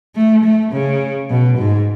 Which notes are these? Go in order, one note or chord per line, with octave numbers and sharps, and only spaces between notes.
A3
A3
C#3
B2
G#2